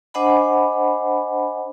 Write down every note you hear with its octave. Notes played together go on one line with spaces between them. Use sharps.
D4 C5 D#5 F#5 G#5 B5